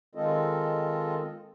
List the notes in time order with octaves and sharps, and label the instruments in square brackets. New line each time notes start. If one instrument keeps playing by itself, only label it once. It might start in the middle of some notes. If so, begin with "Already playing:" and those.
[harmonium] D#3 G#3 C4 F4 A4 D#5